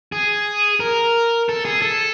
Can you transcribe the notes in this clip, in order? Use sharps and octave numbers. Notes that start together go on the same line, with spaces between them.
G#4
A#4
A4
G#4
A4